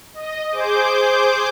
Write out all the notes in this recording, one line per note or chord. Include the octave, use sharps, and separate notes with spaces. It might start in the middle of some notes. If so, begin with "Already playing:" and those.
D#5
G#4 C5 D6 G6